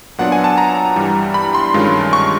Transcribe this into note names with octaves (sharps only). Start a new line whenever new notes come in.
A#2 F#3 B3 D4 F4 F#5
G#5
A5
A#5
G2 E3 G3
B5
C6
G2 D#3 G#3 C#4 F4
C#6